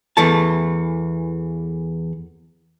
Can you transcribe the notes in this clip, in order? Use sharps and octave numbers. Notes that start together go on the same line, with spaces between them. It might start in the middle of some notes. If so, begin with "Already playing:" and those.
E2 E3 A3 A5